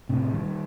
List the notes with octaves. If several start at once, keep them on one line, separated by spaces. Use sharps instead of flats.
A2 C3
D#3 G3